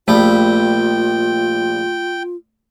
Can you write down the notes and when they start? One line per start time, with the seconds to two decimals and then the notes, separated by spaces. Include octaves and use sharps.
0.08 A#1 G3 A3 F4 G5